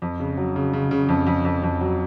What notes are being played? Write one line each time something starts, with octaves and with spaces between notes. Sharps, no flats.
F2
C#3
F#3
C#3
C#3
C#3
F2
F2
F2
F2
F#3